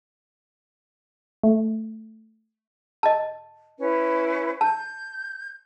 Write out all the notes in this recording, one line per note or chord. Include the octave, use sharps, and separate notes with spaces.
A3
D#5 A5
C#4 E4 B4
A5 G6